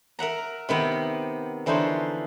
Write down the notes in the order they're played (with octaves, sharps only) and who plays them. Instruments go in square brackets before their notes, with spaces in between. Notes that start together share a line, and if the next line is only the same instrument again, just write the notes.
[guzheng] A#4 E5 F#5 A#5
C3 D#3 B3 G5
D3 E3 F3 D#4 C5 C#5